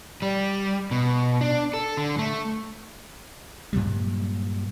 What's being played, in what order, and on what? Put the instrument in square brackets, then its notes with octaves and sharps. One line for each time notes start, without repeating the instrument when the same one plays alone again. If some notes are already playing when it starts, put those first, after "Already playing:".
[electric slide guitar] G3
B2
D4
A4
D3
A3
[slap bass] G2 A#2 F#3 G3